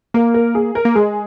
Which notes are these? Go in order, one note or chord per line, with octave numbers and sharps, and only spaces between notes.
A#3 A#4
A#4
G#4
A#4
A#3
G#3 G#4